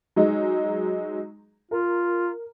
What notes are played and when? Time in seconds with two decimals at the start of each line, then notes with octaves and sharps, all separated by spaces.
0.16 F#3 G#3 D#4
1.71 F4 A#4